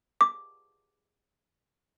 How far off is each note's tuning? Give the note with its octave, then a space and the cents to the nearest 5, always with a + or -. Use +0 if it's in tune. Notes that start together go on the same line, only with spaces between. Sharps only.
D6 +0